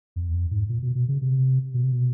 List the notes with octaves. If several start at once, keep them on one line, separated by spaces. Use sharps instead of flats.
F2
E2
F2
G#2
A#2
B2
B2
C#3
C3
B2
C3
B2